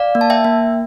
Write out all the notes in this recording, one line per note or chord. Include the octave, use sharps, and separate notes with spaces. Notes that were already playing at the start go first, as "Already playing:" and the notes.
Already playing: D5 F5
A#3
A5
E5 G5
A#3